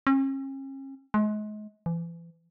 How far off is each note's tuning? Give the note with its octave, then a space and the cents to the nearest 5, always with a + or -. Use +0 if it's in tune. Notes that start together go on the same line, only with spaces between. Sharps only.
C#4 -40
G#3 +35
E3 +35